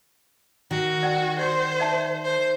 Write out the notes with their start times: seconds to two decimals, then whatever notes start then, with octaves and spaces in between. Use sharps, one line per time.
0.71 D#3 F#4
1.03 D5 F#5 G5
1.39 C5 D5 C6
1.80 D5 E5 A5
2.24 C5